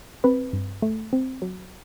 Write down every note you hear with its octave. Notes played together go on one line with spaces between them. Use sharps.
C4 B4 B5
G2
A3
C4
F#3